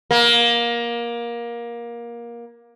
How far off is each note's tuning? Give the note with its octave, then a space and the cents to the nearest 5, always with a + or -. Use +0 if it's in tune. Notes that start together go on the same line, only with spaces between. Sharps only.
A#3 +20